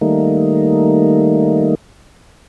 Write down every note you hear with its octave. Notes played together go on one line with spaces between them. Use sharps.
D#3 G3 A3 A#3 D#4